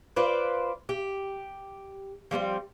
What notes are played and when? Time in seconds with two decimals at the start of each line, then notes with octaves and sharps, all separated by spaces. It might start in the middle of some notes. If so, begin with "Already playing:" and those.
0.16 F4 B4 C5 D5
0.89 G4
2.31 F3 G3 B3 C4